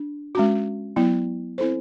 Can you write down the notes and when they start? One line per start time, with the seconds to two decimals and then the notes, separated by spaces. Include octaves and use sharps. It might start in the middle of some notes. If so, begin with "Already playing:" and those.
Already playing: D4
0.35 G#3 C#4 F#4
0.96 F#3 B3 E4
1.58 C4 E4 A4 C5